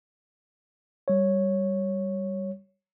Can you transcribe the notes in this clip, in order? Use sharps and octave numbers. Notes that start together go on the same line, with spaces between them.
G3 C#5